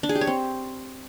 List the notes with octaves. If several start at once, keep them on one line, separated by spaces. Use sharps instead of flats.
D4
G#4
G4
C#5
C4